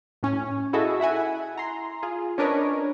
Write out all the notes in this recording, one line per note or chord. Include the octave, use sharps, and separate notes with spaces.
A2 C#4
E4 F#4 G#4 A4 D#5 E5
E4 E5 F#5 G#5
A#5 C6
F4 G#4
C#4 D4 A#4 B4 C#5 D#5